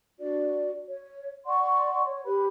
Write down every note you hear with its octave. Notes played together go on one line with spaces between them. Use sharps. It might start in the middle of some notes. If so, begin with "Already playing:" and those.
D4 F#4 D5
C#5
D5 F#5 C6 C#6
C#5
G4 B4 B5